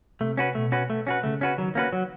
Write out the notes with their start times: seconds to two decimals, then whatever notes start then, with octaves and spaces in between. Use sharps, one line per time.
0.20 C3 A3
0.37 C#4 F#4 B4
0.55 B2 A3
0.72 C#4 F#4 B4
0.90 A3
1.07 C#4 F#4 B4
1.23 C#3 A3
1.41 C#4 F#4 B4
1.58 D#3 F#3
1.75 A#3 C#4 F#4 B4
1.93 F#3